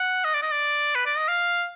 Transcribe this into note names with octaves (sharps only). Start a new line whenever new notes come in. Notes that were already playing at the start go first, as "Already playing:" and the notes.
Already playing: F#5
D#5
D5
D#5
D5
B4
D5
D#5
F5